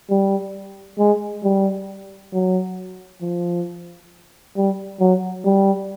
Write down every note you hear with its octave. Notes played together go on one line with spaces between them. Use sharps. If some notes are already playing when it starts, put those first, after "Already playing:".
G3
G#3
G3
F#3
F3
G3
F#3
G3